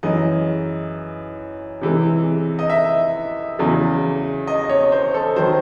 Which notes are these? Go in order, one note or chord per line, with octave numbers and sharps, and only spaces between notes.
F#2 E3 G#3 D#5
C3 E3 G#3
D#5
E5
E2 C#3 F#3
D#5
C#5
C5
A4
D#3 F#3 C5